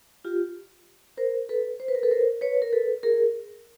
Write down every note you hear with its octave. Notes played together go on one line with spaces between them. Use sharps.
F4 G4
A#4 C5
A4 B4
C5
B4
A#4
A4 B4
A#4 C5
B4 C#5
A#4
A4 B4
G#4 A#4